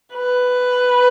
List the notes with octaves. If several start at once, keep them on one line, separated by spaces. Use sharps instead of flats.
B4